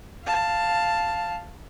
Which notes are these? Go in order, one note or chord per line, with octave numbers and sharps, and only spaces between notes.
F5 A5